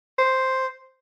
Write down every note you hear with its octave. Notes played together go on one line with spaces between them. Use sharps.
C5